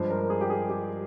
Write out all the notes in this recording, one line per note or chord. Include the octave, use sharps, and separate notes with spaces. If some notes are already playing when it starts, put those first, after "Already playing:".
Already playing: G2 F3 G#3 C5
A#4
G#4
G4
G#4
G4